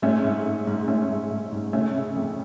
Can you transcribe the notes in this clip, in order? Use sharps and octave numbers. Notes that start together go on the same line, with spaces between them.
G#2 A3 C#4
G#2
G#2
G#2
G#2 A3 C#4
G#2
G#2
G#2
C#3 A3 C#4
C#3
F2